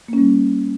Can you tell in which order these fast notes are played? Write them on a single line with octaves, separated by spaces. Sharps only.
A#3 C#4 G3